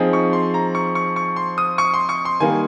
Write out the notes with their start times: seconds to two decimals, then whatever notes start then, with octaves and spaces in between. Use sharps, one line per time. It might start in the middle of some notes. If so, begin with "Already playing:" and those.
Already playing: F3 C4 D#4 G#4
0.13 C#6
0.33 C6
0.54 A#5
0.75 C#6
0.95 C#6
1.16 C#6
1.36 C6
1.58 D#6
1.78 C#6
1.94 C6
2.09 C#6
2.25 C6
2.40 D#3 G3 A#3 G#5